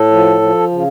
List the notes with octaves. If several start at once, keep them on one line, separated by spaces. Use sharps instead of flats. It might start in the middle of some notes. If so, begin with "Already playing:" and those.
Already playing: A2 A4
F3
F3
C#3